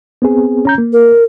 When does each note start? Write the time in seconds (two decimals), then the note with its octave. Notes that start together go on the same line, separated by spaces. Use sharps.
0.22 B3 C4 G#4
0.65 C#4 A#5 G6
0.78 A#3
0.93 A#4